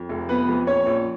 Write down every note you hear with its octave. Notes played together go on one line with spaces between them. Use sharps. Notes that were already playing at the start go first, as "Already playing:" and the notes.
Already playing: F2
F1
F3 B3 B4
F2
A#1 C#4 C#5
A#1